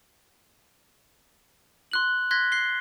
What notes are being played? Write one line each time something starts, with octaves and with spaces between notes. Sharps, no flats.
C6 F#6 F#7
C6 F#6 G#6 A#6 B6
F#6 C7 G7